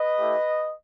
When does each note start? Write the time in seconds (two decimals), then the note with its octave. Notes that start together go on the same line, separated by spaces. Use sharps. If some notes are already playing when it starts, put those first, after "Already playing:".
Already playing: B4 D#5
0.18 A3 E4 G4